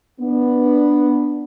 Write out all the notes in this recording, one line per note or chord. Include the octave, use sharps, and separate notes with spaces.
B3 D4